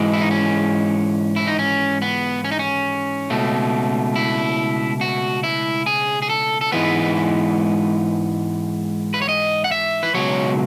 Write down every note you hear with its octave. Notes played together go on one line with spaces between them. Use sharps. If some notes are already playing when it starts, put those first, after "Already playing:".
Already playing: G#2 E3 G#3
E4
D#4
C#4
E4
D#4
C#4
B3
C#4
D#4
C#4
C#2 B2 A3
E4
F#4
E4
G#4
G#4
A4
A4
G#2 E3 G#3 B3 B4
B4
C#5
D#5
F#5
E5
B4
C#2 B2 F#3 C#5